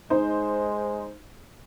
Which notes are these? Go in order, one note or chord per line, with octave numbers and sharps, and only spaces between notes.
G#3 D#4 C5